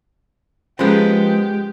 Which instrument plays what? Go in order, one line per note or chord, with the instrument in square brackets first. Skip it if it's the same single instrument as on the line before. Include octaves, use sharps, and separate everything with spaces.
[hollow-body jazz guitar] F3 A#3 B3 [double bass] G#3 [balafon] C#4 G#4 [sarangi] G4